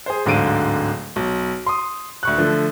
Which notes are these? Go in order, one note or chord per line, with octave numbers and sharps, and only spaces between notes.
G#4 C5
D1 G#2 D3 F5 D7 D#7
B1
C6 D#6
D2 C#6 F#6
D3 F3 A3